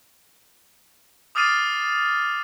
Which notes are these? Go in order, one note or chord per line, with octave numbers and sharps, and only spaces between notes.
D6 D#6 F6 A6 C7 D#7